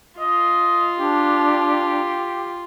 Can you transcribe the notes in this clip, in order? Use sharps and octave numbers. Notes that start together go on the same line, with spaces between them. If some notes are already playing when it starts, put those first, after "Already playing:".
F4 D#5
D4 G4